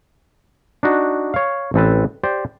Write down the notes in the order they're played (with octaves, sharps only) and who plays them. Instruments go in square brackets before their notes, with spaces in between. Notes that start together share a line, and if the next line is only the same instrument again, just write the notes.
[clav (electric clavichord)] D4 D#4 F#4
C#5 F5
A1 C4 A4 B4 A5
G4 C5 D5